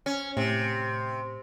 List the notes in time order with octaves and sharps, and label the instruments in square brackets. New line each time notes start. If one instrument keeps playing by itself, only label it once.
[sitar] C#4
[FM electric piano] A2 [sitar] C3